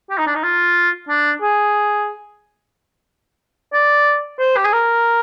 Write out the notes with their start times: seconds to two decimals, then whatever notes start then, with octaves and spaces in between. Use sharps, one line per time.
0.10 G4
0.18 D#4
0.26 D4
0.35 D#4
0.44 F4
1.09 D4
1.42 G#4
3.73 D5
4.39 C5
4.57 G4
4.65 G#4
4.73 A#4